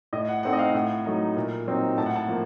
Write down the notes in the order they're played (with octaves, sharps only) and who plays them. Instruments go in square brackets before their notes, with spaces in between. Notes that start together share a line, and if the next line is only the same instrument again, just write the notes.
[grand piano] A2 D#5
F#5
A3 C4 D#4 F#5
D#5
F5
A2 F#5
F#3 A3 D#4
A#2
F#3 C4 D#4
A2 A5
F#5
A5
F3 A#3